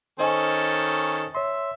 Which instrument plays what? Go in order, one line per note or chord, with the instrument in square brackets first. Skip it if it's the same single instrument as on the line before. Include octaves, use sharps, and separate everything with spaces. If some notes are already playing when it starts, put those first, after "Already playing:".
[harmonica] D#3 C#4 A4 [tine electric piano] C5 D#5 G#5
[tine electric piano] C#5 C6 [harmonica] E5